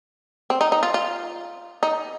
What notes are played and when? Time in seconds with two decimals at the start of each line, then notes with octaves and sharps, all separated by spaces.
0.50 C4
0.61 D#4
0.72 D#4
0.83 F4
0.94 F4
1.83 D#4